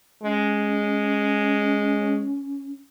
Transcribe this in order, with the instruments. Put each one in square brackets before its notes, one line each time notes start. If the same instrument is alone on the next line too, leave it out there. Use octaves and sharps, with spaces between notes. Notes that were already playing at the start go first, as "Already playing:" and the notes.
[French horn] G#3 [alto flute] C#4